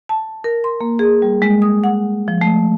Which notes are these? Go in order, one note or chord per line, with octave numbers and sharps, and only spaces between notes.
A5
A#4
C6
A#3
G#4
G3
G#3
D#6
F#5
F3
A3